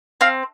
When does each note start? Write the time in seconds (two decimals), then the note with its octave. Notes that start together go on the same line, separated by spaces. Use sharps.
0.21 C4 F5